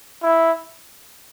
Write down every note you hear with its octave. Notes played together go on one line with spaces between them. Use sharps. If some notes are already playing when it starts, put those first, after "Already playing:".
E4